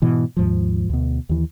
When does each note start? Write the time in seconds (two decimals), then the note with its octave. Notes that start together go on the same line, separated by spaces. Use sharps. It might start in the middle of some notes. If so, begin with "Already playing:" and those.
0.02 G#2 B2 E3
0.37 D#2 G#2 F3
0.89 D2 B2
1.29 D#2 E3